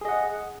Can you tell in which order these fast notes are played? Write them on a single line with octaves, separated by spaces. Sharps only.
G#4 D#5 F#5